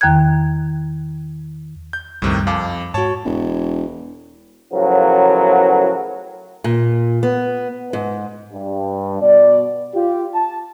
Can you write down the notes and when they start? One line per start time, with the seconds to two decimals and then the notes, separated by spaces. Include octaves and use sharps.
0.01 E2 D#3 G5 A#5 F#6 G#6
1.93 G6
2.22 C2 F#2 A2 C3 D#3 G3
2.47 F2 F5 G#5 A5 D6
2.94 G#2 F#4 C#5 A5
3.25 E1
4.72 A2 C#3 F3 F#3 B3 A#4
6.64 A#2
7.23 B3
7.93 G#2
8.53 G2
9.21 B2 D5
9.95 F4 G4
10.34 A5